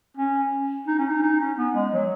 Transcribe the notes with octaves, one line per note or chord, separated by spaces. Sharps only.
C#4
D#4
C#4
D#4
D#4
C#4
B3
G#3
F#3